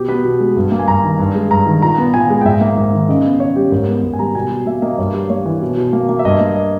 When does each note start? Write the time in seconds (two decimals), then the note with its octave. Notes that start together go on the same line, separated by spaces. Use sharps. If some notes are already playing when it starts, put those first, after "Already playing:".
Already playing: B2 G4
0.09 B3 B4
0.24 B2
0.40 G#3
0.57 G2
0.72 A#3
0.79 G#5
0.88 G2 A#5
1.03 D#3
1.19 G2
1.35 G#3
1.51 G2 A#5
1.66 D#3
1.82 A#2 A#5
1.98 B3
2.14 A#2 G#5
2.30 G#3
2.41 G5
2.45 G#2 E5
2.61 A#3
2.77 G#2
2.93 D#3
3.09 C#3 D#5
3.24 B3
3.40 C#3 C#5
3.56 G3 G4
3.72 G#2 A#4
3.88 B3
4.03 G#2
4.13 G#5
4.19 G3 A#5
4.35 B2 G#5
4.51 B2
4.67 A#3 E5
4.82 A#3 D#5
4.98 G2 C#5
5.14 G3
5.30 A#3 C#5
5.46 E3
5.62 B2
5.77 B2
5.93 A#3
6.09 A#3
6.19 E5
6.25 G2 D#5
6.40 A#3
6.56 D#5